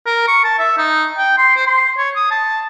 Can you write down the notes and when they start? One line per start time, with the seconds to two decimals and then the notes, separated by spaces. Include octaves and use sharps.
0.06 A#4
0.28 C#6
0.44 A5
0.59 E5
0.78 D#4
1.18 G5
1.38 C6
1.56 C5
1.67 C6
1.98 C#5
2.16 D#6
2.31 A5